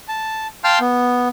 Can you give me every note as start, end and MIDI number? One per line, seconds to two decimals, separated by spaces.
0.08 0.47 81
0.64 0.79 77
0.64 0.79 79
0.64 0.79 81
0.64 0.79 84
0.64 0.79 89
0.64 0.79 91
0.80 1.28 59